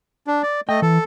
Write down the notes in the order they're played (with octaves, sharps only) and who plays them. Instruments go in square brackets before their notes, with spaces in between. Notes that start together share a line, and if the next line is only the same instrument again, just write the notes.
[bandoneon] D4
D5
[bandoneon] A3 D#5 [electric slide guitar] G5
[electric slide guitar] E3 [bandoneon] A4